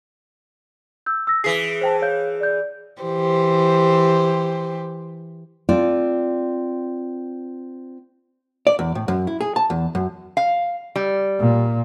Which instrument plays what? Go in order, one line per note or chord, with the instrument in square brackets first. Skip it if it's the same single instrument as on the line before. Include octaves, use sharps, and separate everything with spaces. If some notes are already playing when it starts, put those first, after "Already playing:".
[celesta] E6 G6
E6 A#6
[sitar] E3 G#4 [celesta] B6 C7
[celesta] C5 G5 A5
C#5 F5 G6
D5 G6
[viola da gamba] E3 G4 C5
[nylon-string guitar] C4 F4 A4 D5
[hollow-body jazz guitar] D5
E2
A2
F#2
E4
G#4
A5
E2
F#2
[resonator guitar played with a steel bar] F5
G3
[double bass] A#2